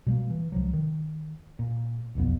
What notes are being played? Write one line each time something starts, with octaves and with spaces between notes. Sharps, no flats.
B2 G3 A#3
E3
C#2 C3 F3 F#3
D#3
A#2
D#1 B1 F2 B3